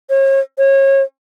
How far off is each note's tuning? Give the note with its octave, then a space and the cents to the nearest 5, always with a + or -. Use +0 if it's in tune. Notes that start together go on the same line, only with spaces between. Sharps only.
C#5 -40
C#5 -30